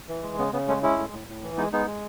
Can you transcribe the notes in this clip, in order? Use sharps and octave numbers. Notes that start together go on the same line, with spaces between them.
E3
G#3
C#3 B3
C#3 B3
G#3 A3 C#4
G#3 C#4 E4
A2
A2
A2
E3
G#3 B3 D#4
G#3 B3 D#4
G#3